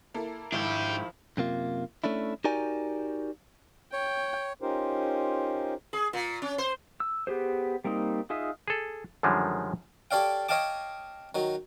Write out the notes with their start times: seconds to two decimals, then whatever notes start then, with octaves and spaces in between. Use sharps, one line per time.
0.14 A#3 E4 A4
0.52 G#2 D#3 F3 D4 E4 G4
1.37 F#2 C3 A#3 F4
2.04 A3 C#4 D4 E4
2.44 D#4 F#4 G4 A#4 D5 G#5
3.93 C#5 G5
4.62 C#4 D#4 F4 G4 A#4 C5
5.93 G#4
6.13 A#2
6.42 C#4
6.58 C5
7.00 E6
7.27 B3 G4 G#4 C5
7.84 G3 A#3 C4 D#4
8.30 D#4 F4 G#4 D#5 E5
8.68 G#4 A4
9.23 F#2 D3 D#3 F3 G3 G#3
10.11 G4 A4 C#5 D5 F5 G5
10.49 C#5 D#5 F5 G5 A5 D6
11.35 D#3 F#3